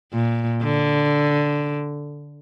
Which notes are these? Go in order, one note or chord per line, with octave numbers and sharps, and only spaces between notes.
A#2
D3